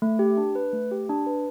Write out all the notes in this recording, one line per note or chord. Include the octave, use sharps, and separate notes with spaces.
A3
G4
D4
B4
A3
G4
D4
B4